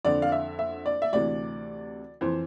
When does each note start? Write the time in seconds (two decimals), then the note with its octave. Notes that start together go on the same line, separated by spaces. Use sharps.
0.05 F2 D3 D5
0.22 F5
0.32 E5
0.59 E5
0.86 D5
1.02 E5
1.13 D2 C3 E3 D5
2.21 F2 E3 C5